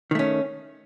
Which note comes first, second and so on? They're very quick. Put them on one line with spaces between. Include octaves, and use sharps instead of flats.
D#3 A3 C#4